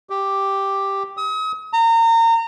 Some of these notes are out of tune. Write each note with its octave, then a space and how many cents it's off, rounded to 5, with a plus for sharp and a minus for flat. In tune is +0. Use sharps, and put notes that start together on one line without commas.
G4 +0
D#6 +40
A#5 -30